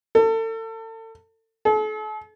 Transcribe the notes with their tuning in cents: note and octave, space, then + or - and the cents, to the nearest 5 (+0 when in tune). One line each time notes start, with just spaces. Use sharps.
A4 +35
A4 -40